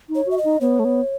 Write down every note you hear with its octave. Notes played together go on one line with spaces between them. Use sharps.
D#4
C#5
F#4 E5
D#5
D#4
B3 C#5
A3
B3